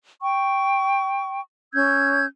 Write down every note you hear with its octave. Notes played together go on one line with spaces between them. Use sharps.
G5 C#6
C#4 E6 G6 G#6